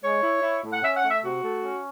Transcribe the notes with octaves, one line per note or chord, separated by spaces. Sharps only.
G#3 C#5
E4
E4
A2
F#5
C#4 E5
F#5
A3
E5
C3 F#4
A3
C#4